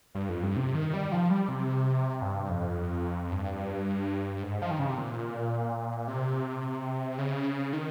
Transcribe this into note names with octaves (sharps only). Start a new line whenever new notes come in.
G2
F2
G2
C3
D#3
G3
F3
G3
C3
G2
F2
G2
G#2
F3
D#3
C#3
C3
A#2
C3
C#3
D#3